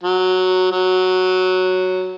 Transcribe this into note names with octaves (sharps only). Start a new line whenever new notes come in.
F#3
F#3